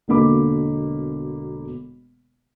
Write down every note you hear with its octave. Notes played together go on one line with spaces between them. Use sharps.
E1 B2 D3 A#3 B5 D6